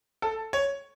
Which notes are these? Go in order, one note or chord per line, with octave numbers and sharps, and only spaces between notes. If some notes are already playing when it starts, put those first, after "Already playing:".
A4
C#5